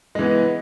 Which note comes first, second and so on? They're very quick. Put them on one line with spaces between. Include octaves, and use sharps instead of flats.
G#3 E3 B3